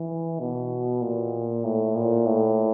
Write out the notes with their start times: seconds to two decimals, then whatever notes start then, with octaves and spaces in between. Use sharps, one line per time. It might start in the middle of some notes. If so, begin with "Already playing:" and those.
Already playing: E3
0.40 B2
1.02 A#2
1.64 A2
1.95 A#2
2.26 A2